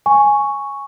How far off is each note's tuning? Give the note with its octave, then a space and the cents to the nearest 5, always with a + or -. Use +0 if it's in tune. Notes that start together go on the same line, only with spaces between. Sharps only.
G#5 +0 C#6 +0